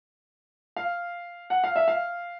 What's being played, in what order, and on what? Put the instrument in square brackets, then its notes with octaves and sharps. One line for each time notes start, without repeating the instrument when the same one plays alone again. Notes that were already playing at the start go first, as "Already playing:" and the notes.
[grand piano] F5
F#5
F5
E5
F5